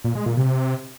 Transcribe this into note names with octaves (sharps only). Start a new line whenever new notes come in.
A#2
G#3
A#2
C3